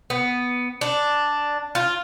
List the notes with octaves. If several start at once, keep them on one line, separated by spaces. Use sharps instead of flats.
B3
D4
F4